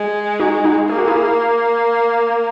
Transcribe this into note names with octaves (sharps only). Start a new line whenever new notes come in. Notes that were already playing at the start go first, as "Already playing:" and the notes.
Already playing: G#3
D#4 F#4
D#4 F#4
A#3 G#4
F#4
E4 G#4